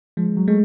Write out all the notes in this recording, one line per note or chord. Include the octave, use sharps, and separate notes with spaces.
F3 G#3
F#3
G#3 A3